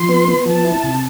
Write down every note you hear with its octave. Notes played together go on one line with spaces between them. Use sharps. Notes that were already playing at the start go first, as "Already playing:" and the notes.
Already playing: F3 C6
B3
B3
F3 A5
E4
C3